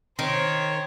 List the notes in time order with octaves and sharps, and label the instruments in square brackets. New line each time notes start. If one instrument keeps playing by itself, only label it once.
[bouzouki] D#3 [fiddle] C5 C#5